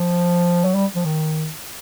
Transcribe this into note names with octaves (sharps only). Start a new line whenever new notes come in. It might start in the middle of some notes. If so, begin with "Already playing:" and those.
Already playing: F3
F#3
G3
F3
D#3